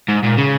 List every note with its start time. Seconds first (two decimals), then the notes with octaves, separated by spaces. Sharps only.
0.08 G#2
0.23 A#2
0.38 C#3